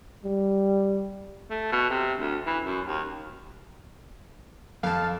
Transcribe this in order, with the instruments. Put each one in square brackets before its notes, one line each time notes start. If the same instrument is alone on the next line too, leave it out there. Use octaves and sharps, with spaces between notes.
[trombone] G3
[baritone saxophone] A3
B2
C3
D2
E3
F#2
D#2
[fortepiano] F2 [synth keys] F5 A5